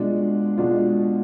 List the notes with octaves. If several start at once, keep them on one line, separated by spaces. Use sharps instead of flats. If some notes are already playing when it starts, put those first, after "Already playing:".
Already playing: B2 G#3 D4 F4
B2 G#3 D4 F4